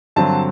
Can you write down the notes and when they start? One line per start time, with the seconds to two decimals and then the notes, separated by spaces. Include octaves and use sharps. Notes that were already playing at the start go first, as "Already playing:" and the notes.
0.16 G2 D3 F#3 C4 A5